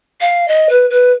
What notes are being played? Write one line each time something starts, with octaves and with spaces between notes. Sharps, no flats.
F5
D#5
B4
B4